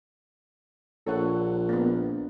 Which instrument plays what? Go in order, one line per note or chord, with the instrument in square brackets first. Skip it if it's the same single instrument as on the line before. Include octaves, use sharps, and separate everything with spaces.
[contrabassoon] A#1 [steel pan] A4 C#5 F#5
[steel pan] A#3 B3